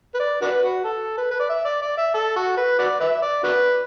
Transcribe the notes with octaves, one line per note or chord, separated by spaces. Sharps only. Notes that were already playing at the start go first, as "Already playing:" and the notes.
B4
D5
D4 F#4 B4
F#4
A4
B4
B4
D5
E5
D5
D5
E5
A4
F#4
B4
F#4 B4 D5
B4 E5
D5
D4 F#4 B4